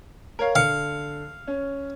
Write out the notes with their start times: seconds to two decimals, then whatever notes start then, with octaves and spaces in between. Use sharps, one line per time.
0.39 A#4 C#5 F5
0.56 D3 F5 C#7
1.47 C#4